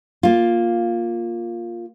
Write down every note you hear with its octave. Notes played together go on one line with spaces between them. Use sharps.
A#3 F4